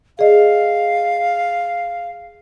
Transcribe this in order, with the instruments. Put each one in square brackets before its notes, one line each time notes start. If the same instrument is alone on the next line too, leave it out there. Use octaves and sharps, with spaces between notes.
[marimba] G#4 D5 D#5 [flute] F5